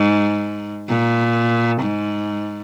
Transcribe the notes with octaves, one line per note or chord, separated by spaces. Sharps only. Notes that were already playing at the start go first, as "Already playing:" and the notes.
Already playing: G#2
A#2
G#2